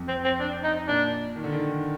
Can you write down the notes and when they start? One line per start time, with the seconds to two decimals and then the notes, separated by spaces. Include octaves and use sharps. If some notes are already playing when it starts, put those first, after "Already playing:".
Already playing: F2
0.08 C4
0.25 C4
0.40 D4
0.64 D#4
0.88 A#2 D4
1.36 D#3
1.44 D3
1.52 D#3